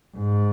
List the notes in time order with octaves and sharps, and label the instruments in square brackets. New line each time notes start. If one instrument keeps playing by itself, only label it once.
[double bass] G#2